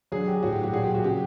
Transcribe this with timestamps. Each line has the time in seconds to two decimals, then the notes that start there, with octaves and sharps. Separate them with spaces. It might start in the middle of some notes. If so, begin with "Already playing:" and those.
0.12 D3 F#3 G#4
0.27 G4
0.43 A2 F#3 F#4
0.52 G4
0.63 F#4
0.73 A#2 G#4
0.76 F#3
0.83 G4
0.94 F#4
1.04 C#3 F#3 G4